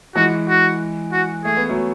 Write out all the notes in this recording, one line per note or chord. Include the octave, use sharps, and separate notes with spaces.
E3 G#3 F#4
F#4
F#4
A3 G#4
B3
F#3 A3